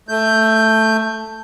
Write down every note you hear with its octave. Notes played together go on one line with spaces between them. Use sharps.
A3 G6